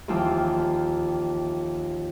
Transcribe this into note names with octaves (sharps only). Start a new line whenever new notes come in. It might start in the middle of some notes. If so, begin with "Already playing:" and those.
D#2 E3 F3 G5 F6